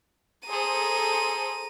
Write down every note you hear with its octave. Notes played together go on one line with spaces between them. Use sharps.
G#4 A4 C5 A#5 D#7